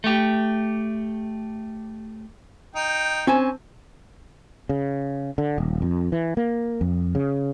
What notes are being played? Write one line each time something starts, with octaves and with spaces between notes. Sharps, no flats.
A3 G4
D#4 G5
C4 C#4 G#5 A5
C#3
D3
D#1
F2
E3
A#3
F2
C#3